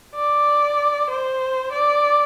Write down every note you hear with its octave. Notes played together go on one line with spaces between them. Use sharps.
D5
C5
D5